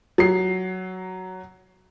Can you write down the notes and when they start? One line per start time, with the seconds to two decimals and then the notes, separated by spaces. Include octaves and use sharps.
0.18 F#3 C7